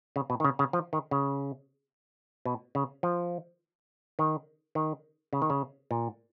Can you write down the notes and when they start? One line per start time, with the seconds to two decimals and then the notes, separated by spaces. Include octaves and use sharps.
0.16 C#3
0.30 B2
0.40 D#3
0.45 C#3
0.59 C#3
0.73 F3
0.93 D#3
1.11 C#3
2.45 B2
2.75 C#3
3.03 F3
4.19 D#3
4.75 D#3
5.33 C#3
5.42 D#3
5.50 C#3
5.91 A#2